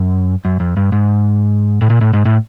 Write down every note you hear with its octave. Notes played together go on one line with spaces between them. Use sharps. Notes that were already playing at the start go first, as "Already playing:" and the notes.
Already playing: F#2
F#2
F2
G2
G#2
A2
A#2
A2
G#2
A2